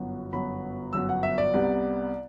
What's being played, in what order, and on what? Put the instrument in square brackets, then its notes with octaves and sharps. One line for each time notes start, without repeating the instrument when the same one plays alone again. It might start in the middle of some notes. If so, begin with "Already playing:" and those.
Already playing: [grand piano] G1 F#2 F#3 B3
G1 F#2 F#3 B3 B5
G1 F#2 F#3 B3 E6
F#5
E5
D5
C2 C3 G3 B3